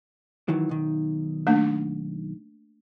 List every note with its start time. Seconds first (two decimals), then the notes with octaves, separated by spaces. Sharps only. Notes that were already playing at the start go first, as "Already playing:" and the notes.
0.48 D#3 E3 F#3
0.69 B1 D#3
1.47 A3 A#3 D4